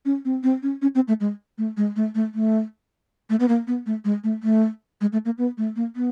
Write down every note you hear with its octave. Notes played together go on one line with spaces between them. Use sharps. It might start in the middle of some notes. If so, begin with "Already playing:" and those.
C#4
C4
C4
C#4
C#4
C4
A3
G#3
A3
G#3
A3
A3
A3
A3
B3
A#3
B3
A3
G#3
A3
A3
G#3
A3
A#3
B3
A3
A#3
B3